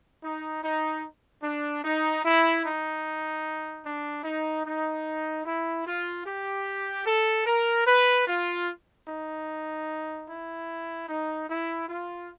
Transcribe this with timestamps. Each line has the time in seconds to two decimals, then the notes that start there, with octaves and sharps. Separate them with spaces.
0.23 D#4
0.63 D#4
1.43 D4
1.84 D#4
2.24 E4
2.64 D#4
3.85 D4
4.24 D#4
4.66 D#4
5.46 E4
5.86 F4
6.26 G4
7.06 A4
7.46 A#4
7.87 B4
8.27 F4
9.08 D#4
10.28 E4
11.08 D#4
11.49 E4
11.88 F4